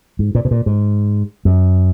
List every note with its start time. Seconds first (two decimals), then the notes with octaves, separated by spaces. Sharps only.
0.19 G#2
0.35 A#2
0.45 B2
0.51 A#2
0.66 G#2
1.45 F#2